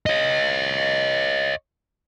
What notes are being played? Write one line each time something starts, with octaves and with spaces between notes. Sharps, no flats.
C#5 D#5